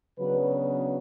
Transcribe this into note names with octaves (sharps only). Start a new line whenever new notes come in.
C#3 F#3 B3 D4 B4